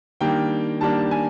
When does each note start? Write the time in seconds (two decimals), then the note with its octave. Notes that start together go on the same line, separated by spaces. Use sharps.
0.21 D#3 G3 A#3 D4 G5
0.81 D#3 G3 A#3 D4 A5
1.11 G#5